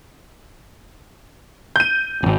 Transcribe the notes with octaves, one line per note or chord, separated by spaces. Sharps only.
G6 D#7
D1 G#1